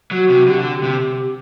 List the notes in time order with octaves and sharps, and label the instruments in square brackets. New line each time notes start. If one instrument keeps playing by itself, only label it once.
[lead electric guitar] F#3 [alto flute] F#4
[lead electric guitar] C3
[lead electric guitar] D3 [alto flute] G4
[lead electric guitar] C3